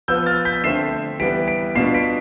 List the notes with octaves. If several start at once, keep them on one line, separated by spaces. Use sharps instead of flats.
F3 B3 F4 E6 G6
F6 A6
G6 B6
D3 A3 C4 C7 E7
E3 G3 B3 B6 D7
B6 D7
B2 B3 D4 F4 C7 E7
B6 D7